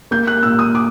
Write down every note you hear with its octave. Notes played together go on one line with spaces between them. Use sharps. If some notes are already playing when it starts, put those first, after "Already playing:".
A#3 G6
F#6
A#2 E6
D#6
D6